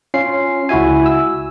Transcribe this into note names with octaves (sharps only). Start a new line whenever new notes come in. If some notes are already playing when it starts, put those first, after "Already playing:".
C#4 F4 C7
C#2 E4 F#4 E5 G#5
E6